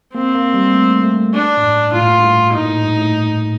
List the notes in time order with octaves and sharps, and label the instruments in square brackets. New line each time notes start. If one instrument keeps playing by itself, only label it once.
[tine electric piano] A#3 [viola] C4
[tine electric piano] A#3
G3
A3
A3
[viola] D4
[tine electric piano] A2
G2
[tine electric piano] A2 [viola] F4
[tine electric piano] A#2
A2
G2
A2
[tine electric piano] A#2 [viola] D#4
[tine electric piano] A2
G2
A2